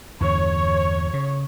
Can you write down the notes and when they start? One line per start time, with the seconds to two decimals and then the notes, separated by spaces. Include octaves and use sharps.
0.21 E2 G2 D3 C#5
1.14 C#3